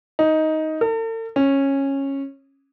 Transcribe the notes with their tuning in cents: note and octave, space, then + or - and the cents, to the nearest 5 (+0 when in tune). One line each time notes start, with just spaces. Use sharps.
D#4 +10
A4 +45
C#4 -15